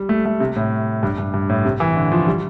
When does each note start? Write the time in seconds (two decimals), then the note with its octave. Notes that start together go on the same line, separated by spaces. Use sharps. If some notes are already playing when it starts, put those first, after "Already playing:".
Already playing: G3
0.09 A3
0.25 A3
0.40 C3
0.56 A2
1.03 G2
1.18 G2
1.34 G2
1.49 A2
1.65 C3
1.80 E3
1.96 D3
2.12 F3
2.28 G3